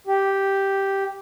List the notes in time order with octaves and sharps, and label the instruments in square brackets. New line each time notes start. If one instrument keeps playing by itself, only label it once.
[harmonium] G4